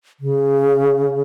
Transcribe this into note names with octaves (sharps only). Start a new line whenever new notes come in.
C#3